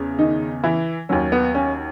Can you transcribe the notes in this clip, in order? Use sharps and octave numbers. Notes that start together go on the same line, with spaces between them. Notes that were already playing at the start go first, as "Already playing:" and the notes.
Already playing: E2 C#3
D#3 D#4
E3 E4
D#2 D#3 F#3 C#4
B3
C#4